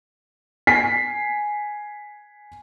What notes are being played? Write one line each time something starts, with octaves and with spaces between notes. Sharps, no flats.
G#5 B6 C7